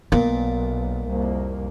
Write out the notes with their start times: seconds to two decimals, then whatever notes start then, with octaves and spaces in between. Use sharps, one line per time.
0.12 B1 A#2 B3
1.07 C2 F2 A#3